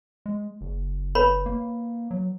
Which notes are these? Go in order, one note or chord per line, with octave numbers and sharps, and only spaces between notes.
G#3
F#1
B4 C#5 B5
A#3
F#3